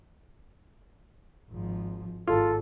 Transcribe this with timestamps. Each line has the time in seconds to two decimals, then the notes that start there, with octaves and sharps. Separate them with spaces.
1.51 G#1 F3
2.27 G#1 G#2 F4 A4